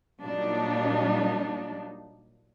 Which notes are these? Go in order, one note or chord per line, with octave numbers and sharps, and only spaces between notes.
A#2 F#3 G3 A#3 D4 D#4